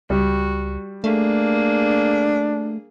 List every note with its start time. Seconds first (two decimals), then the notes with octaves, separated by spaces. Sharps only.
0.10 C#2 G3 F#4
1.04 A3 A#3 D4 G#4